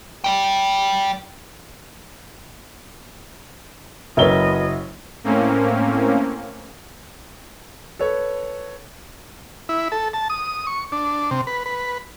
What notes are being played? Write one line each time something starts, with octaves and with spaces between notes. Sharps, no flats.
D5 G5
F#1 F#4 A#4 B4 C#5 D#5 E5 G7
A2 A#3 C4 C#4
A4 B4 C#5
E4
A4
A5
D#6
C#6
D4
C3
B4
B4